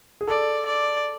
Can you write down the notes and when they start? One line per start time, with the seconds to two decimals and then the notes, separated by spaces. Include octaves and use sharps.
0.21 G#4
0.28 A4 D5
0.65 D5